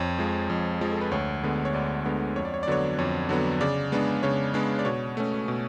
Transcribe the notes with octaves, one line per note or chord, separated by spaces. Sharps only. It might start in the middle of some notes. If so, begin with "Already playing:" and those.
Already playing: F2 C#5
F3 G#3
F2
F3 G#3
A4
B4
D2 C#5
D3 G#3 B3
C#5
D2 D5
D3 G#3 B3
F2 C#5
D5
C#5
D5
D3 F#3 B3 D4 C#5
F2 C#5
D3 F#3 B3 D4
C#3 D5
G#3 B3 D4
C#3 C#5
G#3 B3 D4
D5
B2 C#5
A3 C#4
B2